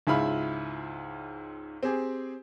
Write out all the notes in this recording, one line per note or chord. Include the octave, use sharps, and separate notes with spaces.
C#2 G#2 E4 F4 B5 F6
C4 G4 G#4